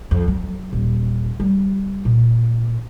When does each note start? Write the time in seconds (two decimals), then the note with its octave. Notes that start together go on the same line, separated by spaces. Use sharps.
0.11 F2
0.28 F#3
0.73 D#1
1.40 G3
2.05 A#2